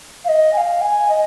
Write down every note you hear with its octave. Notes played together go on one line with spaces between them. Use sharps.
F5
D#5
G#5
F5
G#5
D#5